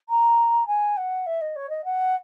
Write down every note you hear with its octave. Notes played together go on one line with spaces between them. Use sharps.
A#5
G#5
F#5
E5
D#5
C#5
D#5
F#5